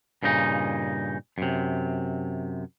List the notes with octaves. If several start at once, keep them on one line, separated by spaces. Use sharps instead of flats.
G2 A#2 C#3 D#4
F#2 C3